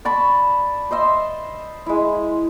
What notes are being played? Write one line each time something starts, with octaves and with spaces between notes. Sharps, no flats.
D5 A5 B5 C#6
C5 D#5 E5 C6
G#3 E4